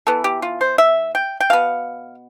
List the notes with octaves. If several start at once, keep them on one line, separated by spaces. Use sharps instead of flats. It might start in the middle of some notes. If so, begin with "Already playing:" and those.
E3 B3 A4
G4
F4
C5
E5
G5
G5
B2 B3 F5